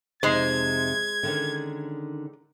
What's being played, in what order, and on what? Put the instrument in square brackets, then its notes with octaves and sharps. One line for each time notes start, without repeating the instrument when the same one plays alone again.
[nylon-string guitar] F2 C3 D#4 [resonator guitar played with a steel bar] G#3 C5 [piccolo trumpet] G#6
[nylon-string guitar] D3 D#3 C#4